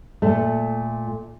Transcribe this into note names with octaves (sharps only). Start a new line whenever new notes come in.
A#2 A3